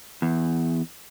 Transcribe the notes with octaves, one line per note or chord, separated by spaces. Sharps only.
E2